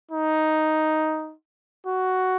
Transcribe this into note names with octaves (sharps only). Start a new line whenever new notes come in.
D#4
F#4